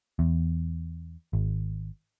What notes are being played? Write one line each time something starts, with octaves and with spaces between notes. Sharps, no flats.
E2
G#1